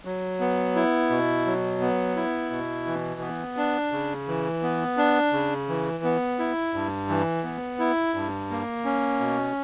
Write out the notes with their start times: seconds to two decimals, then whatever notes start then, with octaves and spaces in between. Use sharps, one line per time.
0.05 F#3
0.40 B3
0.75 E4
1.10 B2
1.46 F#3
1.81 B3
2.16 E4
2.50 B2
2.87 E3
3.21 B3
3.57 D4
3.92 C#3
4.28 E3
4.63 B3
4.97 D4
5.33 C#3
5.69 E3
6.04 B3
6.39 E4
6.74 G2
7.09 E3
7.44 B3
7.79 E4
8.14 G2
8.51 A#3
8.85 C#4
9.20 B2